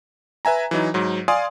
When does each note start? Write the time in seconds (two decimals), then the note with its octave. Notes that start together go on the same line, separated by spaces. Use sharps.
0.45 B4 E5 G#5 A#5
0.71 E3 F#3 D#4
0.94 G#2 F#3
1.28 D5 F5 G#5 C6 D#6